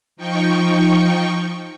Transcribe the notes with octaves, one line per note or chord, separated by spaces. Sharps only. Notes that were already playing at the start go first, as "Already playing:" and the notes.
F3 D#4 G5 C#6